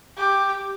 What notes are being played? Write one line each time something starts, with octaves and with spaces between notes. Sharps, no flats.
G4